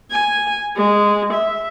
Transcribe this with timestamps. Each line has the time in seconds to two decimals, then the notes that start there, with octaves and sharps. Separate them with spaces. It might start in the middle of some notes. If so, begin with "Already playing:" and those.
0.11 G#5
0.76 G#3
1.33 E5